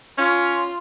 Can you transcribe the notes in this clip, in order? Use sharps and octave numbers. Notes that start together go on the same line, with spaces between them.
C#4 F4